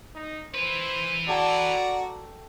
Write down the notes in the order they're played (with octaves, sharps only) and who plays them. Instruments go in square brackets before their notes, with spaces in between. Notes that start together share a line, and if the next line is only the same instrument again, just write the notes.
[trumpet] D#4
[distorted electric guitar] E4 B4 [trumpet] C5
[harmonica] F#4 A#5 [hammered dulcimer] A4 G5 [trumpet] D5